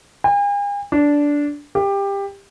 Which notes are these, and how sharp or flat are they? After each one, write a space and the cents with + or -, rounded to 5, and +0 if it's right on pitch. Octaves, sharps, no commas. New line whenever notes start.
G#5 -45
D4 -10
G4 +20